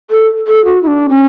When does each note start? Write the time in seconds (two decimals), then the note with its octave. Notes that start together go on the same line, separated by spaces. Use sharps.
0.10 A4
0.47 A4
0.65 F#4
0.83 E4
0.87 D4
1.09 C#4